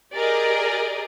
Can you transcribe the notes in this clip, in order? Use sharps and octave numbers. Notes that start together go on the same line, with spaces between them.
G4 G#4 A#4 D5 D#5